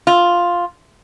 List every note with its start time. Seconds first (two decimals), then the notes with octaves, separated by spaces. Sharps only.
0.07 F4